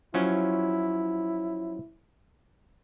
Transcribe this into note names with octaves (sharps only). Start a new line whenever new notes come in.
F3 F#3 C#4 E4